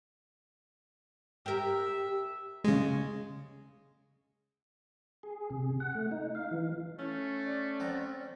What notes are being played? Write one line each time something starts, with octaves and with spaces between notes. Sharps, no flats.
G4 A#4 E5
C#3 G#3
G#4
C3
F#5
A3
D#4
F5
E3
A3 C#4
D5
C4 F#5 A#5